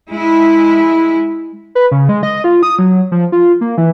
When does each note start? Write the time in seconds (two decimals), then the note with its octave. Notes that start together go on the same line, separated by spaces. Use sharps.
0.11 G#3 E4
1.75 B4
1.92 C#3
2.09 G#3
2.23 D#5
2.44 F4
2.63 D#6
2.79 F#3
3.12 F3
3.32 F4
3.61 A#3
3.78 E3